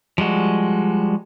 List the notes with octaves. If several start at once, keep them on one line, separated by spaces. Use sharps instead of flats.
F3 G3 G#3 F#4